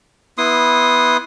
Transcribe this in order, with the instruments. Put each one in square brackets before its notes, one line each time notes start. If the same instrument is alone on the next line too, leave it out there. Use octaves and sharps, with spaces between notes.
[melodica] B3 E4 C6 D#6